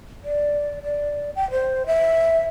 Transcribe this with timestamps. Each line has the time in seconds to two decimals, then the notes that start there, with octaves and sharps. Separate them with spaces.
0.24 D5
0.83 D5
1.36 G5
1.51 C5
1.87 E5